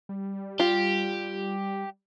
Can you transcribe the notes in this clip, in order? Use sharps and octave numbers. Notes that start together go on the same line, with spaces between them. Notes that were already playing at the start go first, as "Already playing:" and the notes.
G3
F4 G4